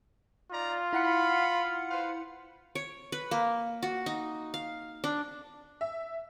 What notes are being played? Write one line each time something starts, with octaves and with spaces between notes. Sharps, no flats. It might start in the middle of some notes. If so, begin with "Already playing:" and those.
D#4 F4 D5 A#5
E4 F5 F#5 B5 C#7
B4 C5 F5
C#5
B4
A#3
F#4
D#4
F5
D4
E5